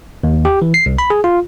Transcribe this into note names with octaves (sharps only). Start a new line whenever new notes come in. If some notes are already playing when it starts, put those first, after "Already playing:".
D#2
G4
E3
C7
C2
B5
G#4
F4